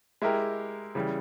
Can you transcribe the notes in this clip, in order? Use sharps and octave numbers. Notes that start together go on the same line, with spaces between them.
G#3 E4 G4 A#4
C#3 E3 G3